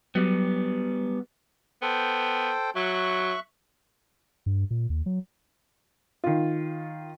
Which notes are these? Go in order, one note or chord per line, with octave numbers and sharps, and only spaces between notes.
F#3 G3 B3
B3 A4 C5 G5
F#3 E5 C#6 F#6
G2
A#2
D#2
F#3
D#3 F4